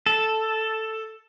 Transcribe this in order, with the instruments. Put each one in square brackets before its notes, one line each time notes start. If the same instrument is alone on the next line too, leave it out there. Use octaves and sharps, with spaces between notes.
[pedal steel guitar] A4